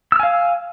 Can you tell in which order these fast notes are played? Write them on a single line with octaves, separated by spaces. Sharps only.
E6 F6 G#5 F5